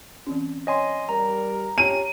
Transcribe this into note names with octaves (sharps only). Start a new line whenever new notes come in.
E3 C4 C#4
C#5 D#5 G5 G#5 C6
G3 A#4 A#5
C#4 G4 C#5 G#5 A5 D#7